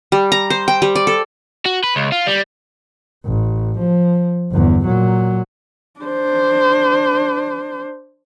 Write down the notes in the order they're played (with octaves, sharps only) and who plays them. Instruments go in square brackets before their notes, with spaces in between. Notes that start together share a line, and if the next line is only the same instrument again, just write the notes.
[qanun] G3
A#5
C5
G5
G3
D5
A4
[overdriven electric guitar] F#4
B4
C#2
F4
G3
[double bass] A1
F3
G1 E2
A#2 F#3
[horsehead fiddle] D4 C5